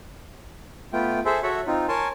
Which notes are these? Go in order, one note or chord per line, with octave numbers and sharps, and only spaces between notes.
A3 B3 F4 G5
G#4 A4 C5 E5
F#4 A4 C#5 E5 F#5
C4 D#4 F4
A#4 C#5 G#5 A5 C6